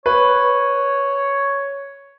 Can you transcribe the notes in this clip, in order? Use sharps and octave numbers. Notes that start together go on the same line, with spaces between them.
B4 C#5